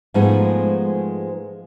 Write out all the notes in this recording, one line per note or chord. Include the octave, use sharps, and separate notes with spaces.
G#2 F3 G#3 A3 B3 D#4